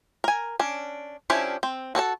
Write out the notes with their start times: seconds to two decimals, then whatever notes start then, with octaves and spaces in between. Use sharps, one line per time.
0.24 A#4 G#5
0.59 C#4 D4
1.30 F3 C#4 D4 E4 G4
1.63 C4
1.95 F#4 A4 C#5 A5